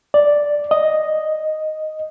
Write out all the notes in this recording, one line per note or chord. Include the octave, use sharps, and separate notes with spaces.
D5
D#5